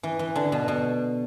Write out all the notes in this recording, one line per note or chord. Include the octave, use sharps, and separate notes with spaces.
E3
E3
D3
B2
B2